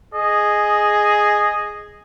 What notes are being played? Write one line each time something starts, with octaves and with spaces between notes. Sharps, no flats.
G#4 D#5